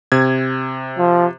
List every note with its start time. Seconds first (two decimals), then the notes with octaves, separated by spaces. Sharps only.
0.12 C3 G#6
0.98 F3